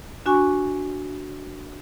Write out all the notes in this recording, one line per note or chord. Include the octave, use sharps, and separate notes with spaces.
D4 F#4 G#5 C#6